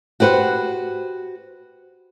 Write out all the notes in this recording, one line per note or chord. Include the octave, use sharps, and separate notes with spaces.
F#4 G4 B4 C5 F#5